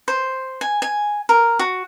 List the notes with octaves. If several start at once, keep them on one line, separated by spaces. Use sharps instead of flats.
C5
G#5
G#5
A#4
F#4